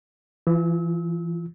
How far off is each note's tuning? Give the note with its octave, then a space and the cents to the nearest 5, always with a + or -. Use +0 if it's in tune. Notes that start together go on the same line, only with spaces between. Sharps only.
E3 +30 F4 -5 E6 -35